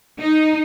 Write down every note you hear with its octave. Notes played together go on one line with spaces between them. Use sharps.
D#4